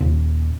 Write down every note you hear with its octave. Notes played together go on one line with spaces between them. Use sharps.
D#1